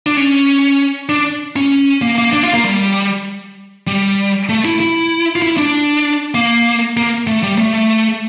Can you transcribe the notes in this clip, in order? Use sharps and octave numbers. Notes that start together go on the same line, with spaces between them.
D4
C#4
D4
C#4
A#3
A#3
D4
F4
A#3
G3
G3
A3
E4
E4
F4
E4
D4
A#3
A#3
A3
G3
A3
A3